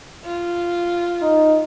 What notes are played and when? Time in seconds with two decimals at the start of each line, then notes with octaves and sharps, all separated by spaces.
0.25 F4
1.22 D#4